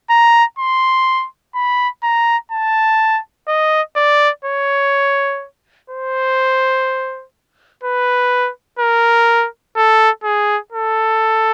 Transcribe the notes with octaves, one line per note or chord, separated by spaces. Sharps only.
A#5
C6
B5
A#5
A5
D#5
D5
C#5
C5
B4
A#4
A4
G#4
A4